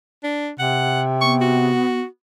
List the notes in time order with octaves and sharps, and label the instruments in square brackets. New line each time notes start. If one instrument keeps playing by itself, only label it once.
[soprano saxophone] D4
[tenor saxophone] C3 [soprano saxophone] F#5
[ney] B3 [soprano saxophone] C#6
[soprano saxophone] F#4